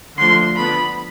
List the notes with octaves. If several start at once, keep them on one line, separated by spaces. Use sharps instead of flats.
D3 F3 A3 D4 C6
D3 F3 B3 D4 B5